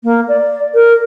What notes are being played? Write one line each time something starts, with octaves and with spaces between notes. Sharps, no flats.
A#3
D5
A#4